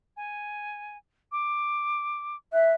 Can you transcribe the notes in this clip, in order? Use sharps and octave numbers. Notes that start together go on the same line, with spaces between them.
G#5
D6
E5 F#6